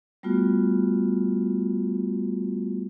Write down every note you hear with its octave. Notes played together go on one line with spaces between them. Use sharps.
G3 A3 B3 F4 F#4